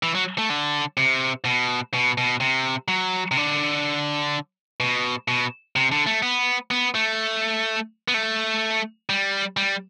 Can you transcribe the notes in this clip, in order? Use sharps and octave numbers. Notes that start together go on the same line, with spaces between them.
E3
F#3
A3
D3
C3
B2
B2
B2
C3
F#3
C3
D3
B2
B2
C3
D3
A3
B3
B3
A3
B3
A3
G3
G3